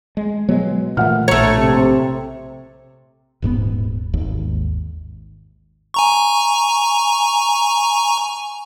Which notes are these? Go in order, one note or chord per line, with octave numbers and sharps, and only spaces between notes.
G#3
B2 F#3 G#3
A#2 E3 A3 F#5 F6
A#1 A2 A3 C#5 A#5
C3
D#1 G#2 G3 B3
G#1 D#2 G#2
G#5 A#5 C#6